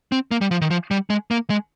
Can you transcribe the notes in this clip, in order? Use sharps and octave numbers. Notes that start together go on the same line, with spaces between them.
C4
A#3
G3
F3
D#3
F3
G3
G#3
A#3
G#3